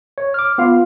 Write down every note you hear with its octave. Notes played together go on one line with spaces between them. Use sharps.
C#5
D6 F6
B3 F4 F5